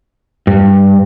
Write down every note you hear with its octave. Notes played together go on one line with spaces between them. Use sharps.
G2